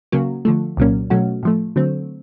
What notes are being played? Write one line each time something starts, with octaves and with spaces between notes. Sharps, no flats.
C#2 C#3 F#3 A#3
D3 F3 A3
C2 A#2 F#3 A#3 C#4
B2 F#3 A3 C#4 F#4
A2 F3 A3
D3 F#3 A3 C4